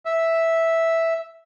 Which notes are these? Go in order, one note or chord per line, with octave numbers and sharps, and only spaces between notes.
E5